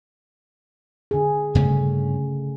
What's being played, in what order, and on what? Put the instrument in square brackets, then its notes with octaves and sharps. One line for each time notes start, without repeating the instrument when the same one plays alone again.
[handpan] D3 G#4
[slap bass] G2 C#4 [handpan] C#3 A3